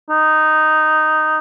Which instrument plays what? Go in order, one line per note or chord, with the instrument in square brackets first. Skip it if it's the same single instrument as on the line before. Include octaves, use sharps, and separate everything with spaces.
[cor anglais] D#4